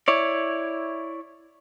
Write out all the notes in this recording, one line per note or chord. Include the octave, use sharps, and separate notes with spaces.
E4 C#5 D5